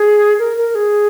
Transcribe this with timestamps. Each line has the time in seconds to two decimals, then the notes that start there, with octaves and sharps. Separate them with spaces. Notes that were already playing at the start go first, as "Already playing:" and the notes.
Already playing: G#4
0.39 A#4
0.57 A#4
0.75 G#4